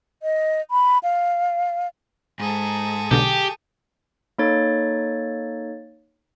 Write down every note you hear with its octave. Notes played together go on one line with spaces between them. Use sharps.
D#5
B5
F5
G#2 G#4 A4
B1 D3 G4
A#3 D#4 A4 C#5 A6